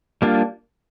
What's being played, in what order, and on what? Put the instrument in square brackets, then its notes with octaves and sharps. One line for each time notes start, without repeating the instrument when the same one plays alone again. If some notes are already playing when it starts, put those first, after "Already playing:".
[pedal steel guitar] G3 A#3 D4 F4